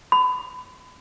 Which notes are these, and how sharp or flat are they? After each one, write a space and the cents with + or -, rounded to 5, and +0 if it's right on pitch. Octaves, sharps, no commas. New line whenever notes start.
B5 +30